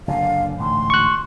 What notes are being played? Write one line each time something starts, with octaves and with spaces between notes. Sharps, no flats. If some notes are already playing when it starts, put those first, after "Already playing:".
F#1 B2 D3 F5
A1 D2 G#2 C6
C#6 F#6